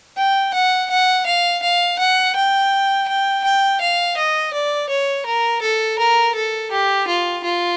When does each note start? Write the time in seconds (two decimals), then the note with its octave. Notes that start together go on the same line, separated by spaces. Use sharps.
0.17 G5
0.54 F#5
0.90 F#5
1.26 F5
1.62 F5
1.99 F#5
2.36 G5
3.08 G5
3.44 G5
3.81 F5
4.17 D#5
4.54 D5
4.90 C#5
5.26 A#4
5.62 A4
5.99 A#4
6.35 A4
6.71 G4
7.08 F4
7.44 F4